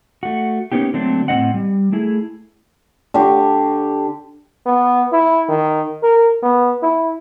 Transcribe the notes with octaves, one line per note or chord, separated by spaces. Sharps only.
A3 F#4
A#3 B3 C#4 D#4 G4
D3 F#3 A3 A#3 C4 D4
A2 A#3 C4 D#5 F#5
G3
A3 E4 G#4
D3 G4 C#6
B3
E4
D#3
A#4
B3
E4